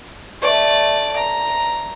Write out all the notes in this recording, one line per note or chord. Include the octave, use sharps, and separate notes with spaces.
A3 D5
A#5